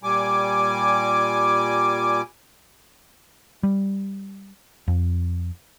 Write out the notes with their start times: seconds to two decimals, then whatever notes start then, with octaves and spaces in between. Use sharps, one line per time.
0.03 A#2 G3 G#5 D6
3.63 G3
4.88 F2